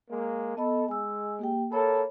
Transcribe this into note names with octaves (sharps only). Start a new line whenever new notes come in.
G#3 A#3
B3 A4 D#5 B5
G#3 G#5 E6
A#3 G4 G5
A#3 A4 C#5 B5